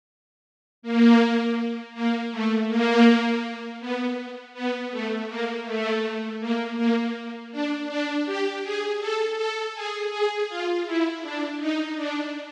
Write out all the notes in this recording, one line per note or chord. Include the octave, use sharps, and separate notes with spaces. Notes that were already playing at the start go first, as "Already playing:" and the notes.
A#3
A#3
A3
A#3
B3
B3
A3
A#3
A3
A#3
A#3
D4
D4
G4
G#4
A4
A4
G#4
G#4
F4
E4
D4
D#4
D4